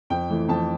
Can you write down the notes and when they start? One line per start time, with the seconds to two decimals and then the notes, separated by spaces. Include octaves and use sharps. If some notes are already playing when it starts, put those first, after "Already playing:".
0.10 F2 G5
0.30 E3 A3
0.49 F2 A5